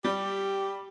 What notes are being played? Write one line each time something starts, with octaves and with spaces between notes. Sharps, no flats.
G3 G4